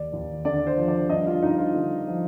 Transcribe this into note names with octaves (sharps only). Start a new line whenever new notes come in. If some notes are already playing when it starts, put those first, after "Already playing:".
Already playing: D#2 D5
D#2
D3 D5
C5
F3
D5
G2 D#5
F4
G2 D#4
F4
D3
F3